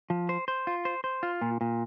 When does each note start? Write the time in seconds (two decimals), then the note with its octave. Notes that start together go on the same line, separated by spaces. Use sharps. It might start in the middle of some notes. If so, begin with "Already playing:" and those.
0.10 F3
0.29 C5
0.48 C5
0.67 F4
0.85 C5
1.04 C5
1.23 F4
1.42 A#2
1.61 A#2